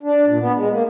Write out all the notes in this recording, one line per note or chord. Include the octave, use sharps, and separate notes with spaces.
D4
A#2
B3
G#3
A#3